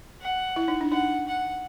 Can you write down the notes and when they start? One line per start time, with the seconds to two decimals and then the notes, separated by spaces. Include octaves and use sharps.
0.22 F#5
0.56 E4
0.68 D#4
0.81 D4
0.92 D#4 F#5
1.27 F#5